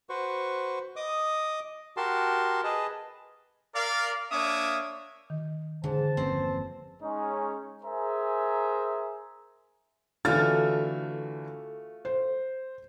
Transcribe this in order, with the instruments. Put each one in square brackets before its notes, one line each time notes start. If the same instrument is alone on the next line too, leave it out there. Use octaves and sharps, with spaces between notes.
[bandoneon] F#4 B4 C5 C#6
D#5 D6 D#6
F#4 G4 A#4 A5 C6
G#4 B4 D#5 A5
[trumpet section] A#4 D5 F5
A#3 D4 C#5 E5 D6 D#6
[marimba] D#3
[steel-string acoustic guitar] G#2 [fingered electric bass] D3 E3 [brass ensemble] C5 A5
[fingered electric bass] G1 F3 A#3 [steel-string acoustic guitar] E2 C4 [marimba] C#4 B4
[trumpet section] G#3 C#4 D#4
G#4 A#4 C5 E5 G#5 A#5
[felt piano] D3 E3 [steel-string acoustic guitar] A3 F4 F#4 [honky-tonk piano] A4 F6 A6
[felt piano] C5